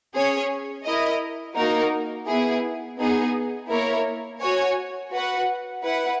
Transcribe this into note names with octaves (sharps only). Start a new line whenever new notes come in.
C#4 G#4 C#5
E4 A#4 D#5
A#3 D#4 F#4 A#4
B3 E4 G#4
B3 D#4 G#4
A#3 E4 A#4 C#5
F#4 C#5 G#5
F#4 B4 F#5
E4 B4 F#5